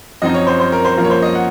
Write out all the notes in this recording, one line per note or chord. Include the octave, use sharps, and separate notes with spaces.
F#2 F3 C4 D#4 D#5
C#5
C5
C5
A#4
C5
F#2 F3 A#3 F4 A#4
C#5
C5
D#5
F#5